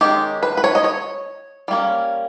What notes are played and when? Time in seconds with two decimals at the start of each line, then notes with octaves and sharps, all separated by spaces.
0.01 D#3 G#3 C#4 G4
0.43 B4
0.57 B4
0.64 C#5
0.75 D#5
0.84 C#5
1.68 G3 A#3 C#4